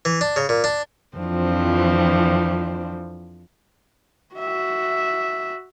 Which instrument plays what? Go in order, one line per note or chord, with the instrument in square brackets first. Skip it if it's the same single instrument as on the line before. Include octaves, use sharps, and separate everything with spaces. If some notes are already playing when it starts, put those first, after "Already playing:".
[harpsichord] E3
D4
C#3
A#2
D4
[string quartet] F2 E3 F3 C4 D4
[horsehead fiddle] F#4 E5